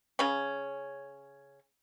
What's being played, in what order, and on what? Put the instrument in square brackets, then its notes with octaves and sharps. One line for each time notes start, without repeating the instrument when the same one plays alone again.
[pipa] C#3 C#4